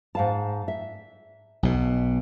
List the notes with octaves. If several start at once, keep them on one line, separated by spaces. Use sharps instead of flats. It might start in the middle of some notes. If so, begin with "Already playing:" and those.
G#2 F5 A5
E5
B1 B2